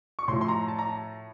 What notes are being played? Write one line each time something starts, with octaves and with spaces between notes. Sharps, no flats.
C#6
A2 F3 C6
C6
A#5
A5
A#5
A5